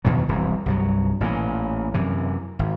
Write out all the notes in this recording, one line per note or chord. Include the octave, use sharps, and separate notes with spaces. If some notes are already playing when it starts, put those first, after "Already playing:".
E2 B2 D#3 F#3
E1 C2 E3
C2 G2 F#3
A1 A#2 C#3 E3
F#2 C3 E3
G#1